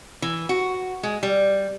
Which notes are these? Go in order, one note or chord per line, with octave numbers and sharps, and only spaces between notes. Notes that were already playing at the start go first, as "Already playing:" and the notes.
E3
F#4
G#3
G3